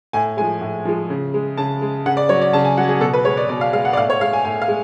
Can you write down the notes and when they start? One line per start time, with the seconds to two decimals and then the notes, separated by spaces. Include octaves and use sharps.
0.13 A2 G#5
0.37 F3 G#3 G#5
0.61 A2
0.85 F3 G#3
1.10 C#3
1.34 G#3
1.57 C#3 A5
1.82 G#3
2.06 C#3 F#5
2.17 D5
2.29 F#3 C#5
2.41 D5
2.53 C#3 A5
2.65 G#5
2.77 F#3 F#5
2.89 G#4
3.01 B2 A4
3.13 B4
3.25 G#3 C#5
3.37 D5
3.49 B2 D5
3.61 F5
3.73 G#3 F5
3.85 F#5
3.93 D5
3.97 A2 F5
4.10 C#5
4.21 G#3 F5
4.33 G#5
4.45 A2 G#5
4.62 F5
4.68 G#3